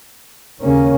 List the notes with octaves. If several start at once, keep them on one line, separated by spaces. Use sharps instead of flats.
D#2 C#3 A#3 C#4